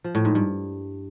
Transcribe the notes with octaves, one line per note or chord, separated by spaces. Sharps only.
F3
A2
G#2
G2